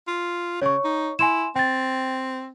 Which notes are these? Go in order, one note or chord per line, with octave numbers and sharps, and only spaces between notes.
F4
C#3 C#5 C#6
D#4
E4 G#5 C6 E7
C4 G5 A6